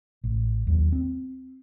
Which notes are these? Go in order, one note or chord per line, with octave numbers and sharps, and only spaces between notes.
A1
D#2 F#3
C4